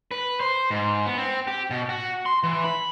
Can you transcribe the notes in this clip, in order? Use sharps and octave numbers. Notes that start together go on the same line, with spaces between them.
B4
C5
G#2
B3
C4
G4
B2
F#4
C6
E3
B5